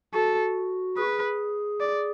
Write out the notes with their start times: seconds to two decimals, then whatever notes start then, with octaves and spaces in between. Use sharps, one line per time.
0.14 F#4 A4
0.97 G#4 B4
1.80 D5